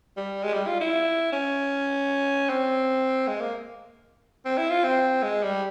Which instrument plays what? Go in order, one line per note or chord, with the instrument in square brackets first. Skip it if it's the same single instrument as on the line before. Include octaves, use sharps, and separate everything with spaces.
[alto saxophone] G3
G#3
G3
F4
E4
C#4
C4
G#3
A#3
C4
E4
F4
C4
G#3
G3